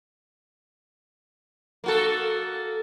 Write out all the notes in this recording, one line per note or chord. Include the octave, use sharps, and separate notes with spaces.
A#3 F#4 A4